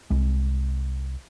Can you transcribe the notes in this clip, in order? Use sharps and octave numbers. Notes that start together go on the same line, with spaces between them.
C2 G#3